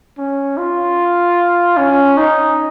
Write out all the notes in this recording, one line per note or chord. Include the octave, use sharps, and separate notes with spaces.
C#4
F4
C#4
D#4